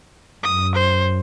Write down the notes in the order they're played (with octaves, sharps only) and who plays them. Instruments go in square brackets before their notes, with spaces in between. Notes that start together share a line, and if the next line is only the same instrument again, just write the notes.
[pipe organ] F#2 [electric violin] D#6
[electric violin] C5